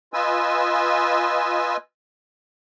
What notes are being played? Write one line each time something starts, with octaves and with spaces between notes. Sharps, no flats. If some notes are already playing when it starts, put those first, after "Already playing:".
F4 B4 D#5 G#5 E6